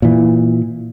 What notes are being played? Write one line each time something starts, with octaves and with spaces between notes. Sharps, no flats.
A#2 E3